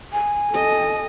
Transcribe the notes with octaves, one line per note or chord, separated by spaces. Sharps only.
G#5
A4 D#5